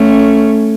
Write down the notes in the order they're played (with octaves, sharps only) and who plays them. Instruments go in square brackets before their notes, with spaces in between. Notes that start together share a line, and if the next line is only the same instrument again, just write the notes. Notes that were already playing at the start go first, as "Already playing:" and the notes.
Already playing: [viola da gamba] A3 C#4